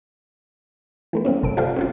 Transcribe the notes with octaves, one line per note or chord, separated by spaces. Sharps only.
E3 A3 B3
G3 A#3 C4 C#4
G1 C3 A4 D7
F4 G4 A4 C5 D5 F5
C4 C#4 F4